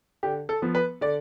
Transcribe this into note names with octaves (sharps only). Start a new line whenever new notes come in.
D3 G4
A4
F3 B3
B4
D3 D5